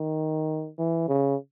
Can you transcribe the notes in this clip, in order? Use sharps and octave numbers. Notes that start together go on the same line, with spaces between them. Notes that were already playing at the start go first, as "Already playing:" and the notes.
Already playing: D#3
E3
C#3